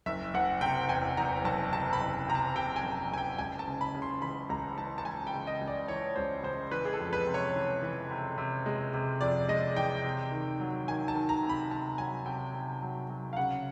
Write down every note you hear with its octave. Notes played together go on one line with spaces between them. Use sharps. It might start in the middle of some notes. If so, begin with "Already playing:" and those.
F#1 E5
F#1 F#5
C3 G5
E2 G#5
E2 A#5
F#1 A5
C3 A5
B5
F#1
C3 A#5
A5
C3 G5
G#5
F#1
F#1 G#5
G5
C#2 G#5
A5
C#3
B5
C#3
C6
E3 B5
C#2 A#5
E3 A5
A5
E3 G#5
G5
C#3
D#5
C#2
D5
E3 C#5
C#2 C5
C#2 C5
E3 B4
G#4
A4
F2
B4
C3
C#5
E3
E3
C3
C3
G#3
C3
F2 D5
G#3 D#5
E3 G5
C3
D#3
F#3
D#3 G#5
A5
D#3
A#5
C3
B5
C3 A5
F#3 G#5
C3 G5
C3
F#3
F#3
F5
C#3 F#5